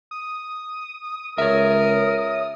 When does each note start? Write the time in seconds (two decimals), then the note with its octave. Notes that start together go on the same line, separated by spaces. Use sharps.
0.11 D#6
1.38 C#2 A#4 C#5 E5